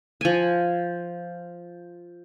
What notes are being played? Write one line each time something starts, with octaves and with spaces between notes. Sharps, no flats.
F3 G#5